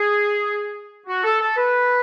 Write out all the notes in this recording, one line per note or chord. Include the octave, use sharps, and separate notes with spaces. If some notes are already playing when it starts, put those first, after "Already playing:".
Already playing: G#4
F#4
A4
A4
B4